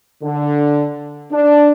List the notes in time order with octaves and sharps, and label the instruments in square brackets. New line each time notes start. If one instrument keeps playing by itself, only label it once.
[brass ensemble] D3
D4